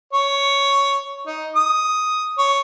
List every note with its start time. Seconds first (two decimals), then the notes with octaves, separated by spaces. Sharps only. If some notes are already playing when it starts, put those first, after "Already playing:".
0.13 C#5
1.27 D#4
1.56 D#6
2.38 C#5